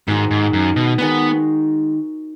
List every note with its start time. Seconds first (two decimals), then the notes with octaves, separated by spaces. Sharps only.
0.07 G#2 D#3 G#3 D#4 F#4
0.31 G#2
0.53 F#2
0.76 B2
0.98 D#3 G#3 B3 D#4 F#4